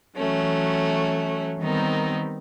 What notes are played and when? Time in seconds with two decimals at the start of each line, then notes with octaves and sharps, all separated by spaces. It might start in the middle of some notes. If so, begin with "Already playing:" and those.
0.16 E3 F#3 A3 C#4
1.60 D#3 G3 B3 C4 D#4 A#4